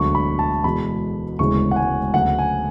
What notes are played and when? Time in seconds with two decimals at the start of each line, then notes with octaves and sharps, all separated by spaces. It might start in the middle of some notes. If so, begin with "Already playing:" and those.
Already playing: E1 D2 D3 F#3 C#6
0.15 B5
0.39 A5
0.64 E2 B2 G#3 B5
1.39 E1 D2 C#3 E3 G#3 C#6
1.71 F#5
1.76 G#5
2.14 D2 C#3 F#3 F#5
2.39 G#5